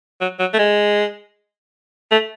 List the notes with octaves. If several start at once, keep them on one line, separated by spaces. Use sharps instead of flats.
F#3
F#3
A3
G#3
A3